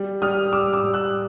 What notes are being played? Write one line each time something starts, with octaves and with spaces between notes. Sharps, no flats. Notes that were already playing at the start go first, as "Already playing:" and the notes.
Already playing: G3
G3 D#6 F6
G3 D6 E6
D6 E6
G3
E6 F#6